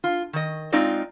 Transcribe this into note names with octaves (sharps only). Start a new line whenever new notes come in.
F4
D#3 D#5
G#3 C4 D#4 F4 D5 D#5